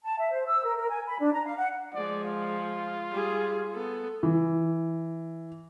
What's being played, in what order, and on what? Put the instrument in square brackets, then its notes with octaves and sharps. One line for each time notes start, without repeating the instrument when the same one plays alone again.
[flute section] A5
E5
C5
E6
A#4
A#4
G#5
B5
D4
A#5
F5
F#5
[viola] F3 G#3 [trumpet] D5
[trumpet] F4
[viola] G3 G#4
B3 A4
[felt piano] E3